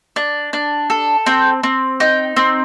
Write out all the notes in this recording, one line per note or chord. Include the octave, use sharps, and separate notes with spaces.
D4
D4
A4
C4 G5
C4
D#4 G5
C4